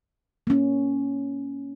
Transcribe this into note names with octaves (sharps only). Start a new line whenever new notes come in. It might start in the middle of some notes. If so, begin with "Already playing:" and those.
A#3 C#4